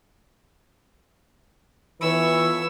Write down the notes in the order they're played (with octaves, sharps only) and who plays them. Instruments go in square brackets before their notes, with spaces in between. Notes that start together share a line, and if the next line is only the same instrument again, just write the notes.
[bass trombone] E3 [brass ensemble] B3 F4 B4 [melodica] A4 B5 [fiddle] C#5 E6